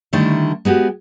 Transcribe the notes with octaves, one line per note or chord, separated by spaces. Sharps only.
D3 D#3 G3 A3 E4
G#3 B3 F#4 G4